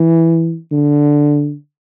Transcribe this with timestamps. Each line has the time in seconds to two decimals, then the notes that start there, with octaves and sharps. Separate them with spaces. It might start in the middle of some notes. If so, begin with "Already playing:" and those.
Already playing: E3
0.71 D3